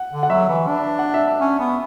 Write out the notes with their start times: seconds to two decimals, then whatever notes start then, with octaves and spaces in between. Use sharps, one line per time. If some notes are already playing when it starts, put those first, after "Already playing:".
Already playing: F#5
0.12 D3
0.23 F#5
0.30 F#3 E5
0.49 E3
0.67 D4
0.99 F#5
1.14 E5
1.27 E5
1.41 C#4
1.59 B3